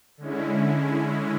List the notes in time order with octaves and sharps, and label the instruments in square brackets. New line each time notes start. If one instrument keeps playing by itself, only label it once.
[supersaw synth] D3 G#3 C#4 E4